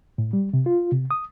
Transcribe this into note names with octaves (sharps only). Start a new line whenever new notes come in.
A2
G3
C3
F4
C3
D#6